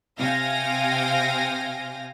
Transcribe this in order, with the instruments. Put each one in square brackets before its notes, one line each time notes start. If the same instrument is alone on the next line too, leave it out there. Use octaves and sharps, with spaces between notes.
[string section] C3 F5 G5 G#5 A#6